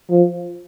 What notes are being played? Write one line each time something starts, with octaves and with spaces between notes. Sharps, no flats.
F3